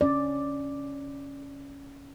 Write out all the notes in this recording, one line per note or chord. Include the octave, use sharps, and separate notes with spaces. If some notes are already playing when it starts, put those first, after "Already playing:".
C#4 D5